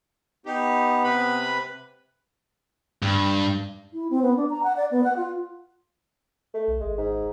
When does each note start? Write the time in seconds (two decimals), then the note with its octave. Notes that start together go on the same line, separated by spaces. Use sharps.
0.46 B3 D#4 G4
1.04 C3 B4 B5
3.02 G2
3.93 E4
4.10 C4
4.22 B3
4.36 D4
4.50 A#5
4.63 F#5
4.77 D5
4.91 B3
5.04 F#5
5.17 F4
6.54 A3
6.68 B1
6.81 G#1 G#3
6.98 G#2